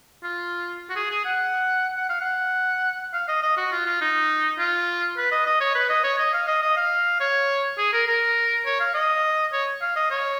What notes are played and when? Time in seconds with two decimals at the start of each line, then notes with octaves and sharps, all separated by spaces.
0.23 F4
0.90 F#4
0.96 G#4
1.11 G#4
1.25 F#5
1.97 F#5
2.09 F5
2.21 F#5
3.13 F5
3.29 D#5
3.43 D#5
3.57 F#4
3.72 F4
3.86 F4
4.01 D#4
4.59 F4
5.17 B4
5.32 D#5
5.46 D#5
5.61 C#5
5.75 B4
5.89 D#5
6.04 C#5
6.18 D#5
6.33 F5
6.48 D#5
6.62 D#5
6.77 F5
7.20 C#5
7.78 G#4
7.93 A#4
8.07 A#4
8.65 C#5
8.80 F5
8.94 D#5
9.53 C#5
9.81 F5
9.96 D#5
10.10 C#5